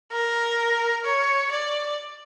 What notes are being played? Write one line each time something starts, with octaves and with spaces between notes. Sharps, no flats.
A#4
C#5
D5